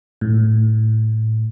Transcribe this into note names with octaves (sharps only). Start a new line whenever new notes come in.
A2